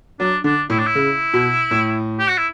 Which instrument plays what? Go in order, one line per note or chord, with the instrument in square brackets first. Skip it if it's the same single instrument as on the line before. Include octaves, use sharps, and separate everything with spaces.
[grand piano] F#3 [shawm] D4
[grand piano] D3 [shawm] D4
[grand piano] A2 [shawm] E4
[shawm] D4
E4
[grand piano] C#3
B2
A2
[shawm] G4
F#4
E4